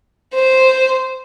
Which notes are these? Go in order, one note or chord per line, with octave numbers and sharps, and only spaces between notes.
C5